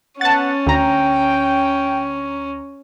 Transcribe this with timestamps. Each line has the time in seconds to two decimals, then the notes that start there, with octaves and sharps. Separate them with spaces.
0.21 B3 C#4 F#5 A5 A6
0.66 D2 G5 A#5